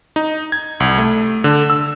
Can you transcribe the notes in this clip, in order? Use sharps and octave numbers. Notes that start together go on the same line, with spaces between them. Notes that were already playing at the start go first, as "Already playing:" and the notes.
D#4
G#6
C2
A3
D3
E6